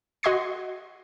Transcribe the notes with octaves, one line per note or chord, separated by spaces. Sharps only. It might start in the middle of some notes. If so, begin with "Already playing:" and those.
F#4 D#5 C6 C#6 G#6 C7